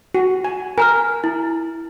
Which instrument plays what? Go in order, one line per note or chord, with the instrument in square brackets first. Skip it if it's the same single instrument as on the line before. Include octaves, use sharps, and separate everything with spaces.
[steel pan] F#4
G#5
[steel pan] A#4 [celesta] G#5 A#5 F6
[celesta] E4